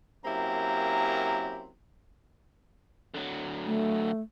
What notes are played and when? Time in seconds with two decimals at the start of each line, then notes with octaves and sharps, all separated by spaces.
0.25 F#2 A#3 C4 E4 G4 A#5
3.14 D3 F#3
3.65 A3